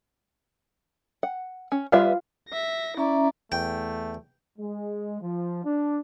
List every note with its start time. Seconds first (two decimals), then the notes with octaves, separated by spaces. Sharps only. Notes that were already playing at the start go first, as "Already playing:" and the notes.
1.23 F#5
1.72 C#4
1.92 G3 F4 B4 E5 F5
2.49 E5 A#6
2.97 C#4 E4 D5 E5 A#5
3.52 E2 A3 G5
4.59 G#3
5.21 F3
5.65 D4